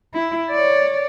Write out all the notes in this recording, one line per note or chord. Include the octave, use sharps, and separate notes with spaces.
E4
C#5 D5